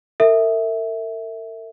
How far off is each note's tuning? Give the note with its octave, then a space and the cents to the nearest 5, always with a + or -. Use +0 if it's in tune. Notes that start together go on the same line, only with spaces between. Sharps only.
A#4 -45 E5 -10